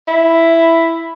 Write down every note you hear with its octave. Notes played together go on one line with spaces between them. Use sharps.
E4